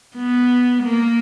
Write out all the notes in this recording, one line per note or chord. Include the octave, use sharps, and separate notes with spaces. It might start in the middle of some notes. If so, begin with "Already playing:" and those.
B3
A#3